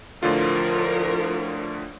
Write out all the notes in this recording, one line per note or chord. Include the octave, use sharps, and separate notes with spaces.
A2 D3 F3 F4 A#4